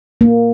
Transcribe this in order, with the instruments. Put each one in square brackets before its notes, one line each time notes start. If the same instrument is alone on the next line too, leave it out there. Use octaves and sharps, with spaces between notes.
[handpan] A#3